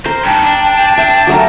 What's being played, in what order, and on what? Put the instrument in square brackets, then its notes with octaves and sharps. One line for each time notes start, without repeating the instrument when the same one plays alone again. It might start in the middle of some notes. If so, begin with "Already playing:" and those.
[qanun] A#4 [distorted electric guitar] C5
[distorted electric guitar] G2 D#3 [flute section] G5 A5
[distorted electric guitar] D4
[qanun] E5
F#3 A3 A#4